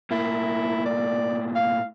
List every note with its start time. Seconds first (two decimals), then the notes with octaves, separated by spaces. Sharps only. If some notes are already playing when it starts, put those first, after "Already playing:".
0.11 A2 A#3 E4
0.86 D5
1.55 F5